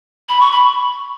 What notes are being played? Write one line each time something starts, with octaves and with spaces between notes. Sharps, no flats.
B5
C#6
B5